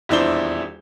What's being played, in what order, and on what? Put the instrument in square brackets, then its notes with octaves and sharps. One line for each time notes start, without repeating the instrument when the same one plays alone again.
[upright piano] D#1 E2 D4 E4 C5 G7